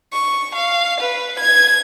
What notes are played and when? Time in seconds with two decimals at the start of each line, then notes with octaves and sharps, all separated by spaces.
0.12 C#6
0.55 F5
1.00 B4
1.39 G#6